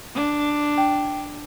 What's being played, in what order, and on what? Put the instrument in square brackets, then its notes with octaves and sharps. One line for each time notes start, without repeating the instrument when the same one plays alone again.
[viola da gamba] D4
[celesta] G5